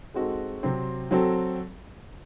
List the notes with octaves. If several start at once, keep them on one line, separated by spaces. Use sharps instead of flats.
G#3 C4 D#4 F#4 A4
C3 F#3 C4
F#3 C4 F#4 A4